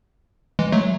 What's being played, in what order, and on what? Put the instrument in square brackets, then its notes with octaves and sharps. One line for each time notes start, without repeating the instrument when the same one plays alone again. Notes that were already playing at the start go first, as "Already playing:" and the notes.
[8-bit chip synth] E3 G#3
F#3 A3